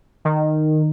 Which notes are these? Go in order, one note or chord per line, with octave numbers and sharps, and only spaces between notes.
D#3